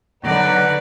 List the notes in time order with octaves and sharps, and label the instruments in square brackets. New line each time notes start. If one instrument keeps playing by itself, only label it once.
[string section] D3 D#4 [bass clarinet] F#3 [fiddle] B4 D5 [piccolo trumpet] F#5